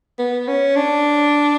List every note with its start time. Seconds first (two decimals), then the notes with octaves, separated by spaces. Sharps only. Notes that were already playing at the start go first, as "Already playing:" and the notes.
0.19 B3
0.48 C#4
0.76 D4